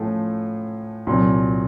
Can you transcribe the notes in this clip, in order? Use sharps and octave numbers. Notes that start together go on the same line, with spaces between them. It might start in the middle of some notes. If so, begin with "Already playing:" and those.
Already playing: A2 F3 A3 C#4 F4
C2 A#2 F#3